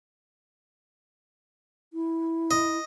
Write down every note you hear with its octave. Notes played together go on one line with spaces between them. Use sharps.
E4
D#5